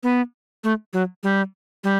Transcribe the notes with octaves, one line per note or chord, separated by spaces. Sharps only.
B3
A3
F#3
G3
G3